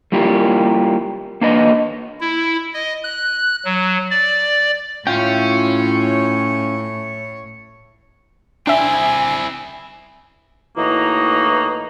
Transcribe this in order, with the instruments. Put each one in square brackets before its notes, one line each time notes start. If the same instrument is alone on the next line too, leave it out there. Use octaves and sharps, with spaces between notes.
[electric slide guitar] G3 A#3 E4 F4 G4
A#3 D4 B4 D#5
[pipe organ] E4
D#5
F#6
F#3
D5
[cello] A2 C#5 [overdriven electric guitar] C#4 [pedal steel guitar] E4 F5 G5 [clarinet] F4
[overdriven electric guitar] C4 E4 [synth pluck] D4 E5 [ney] G#5
[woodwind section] A2 E3 A#3 D#4 F#4